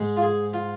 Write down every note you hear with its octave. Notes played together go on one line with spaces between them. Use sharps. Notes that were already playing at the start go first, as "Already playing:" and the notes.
Already playing: G#2 G#3
F4
G#4
F4